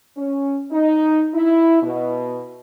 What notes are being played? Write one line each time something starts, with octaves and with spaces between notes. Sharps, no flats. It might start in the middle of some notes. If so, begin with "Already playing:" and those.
C#4
D#4
E4
B2